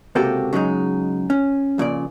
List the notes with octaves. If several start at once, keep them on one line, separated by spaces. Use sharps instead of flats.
C#2 C3 A#3 F#4 G4 A4
C#3 F#3 G#3 C4 D#4
C#4
F2 A#2 C#3 D5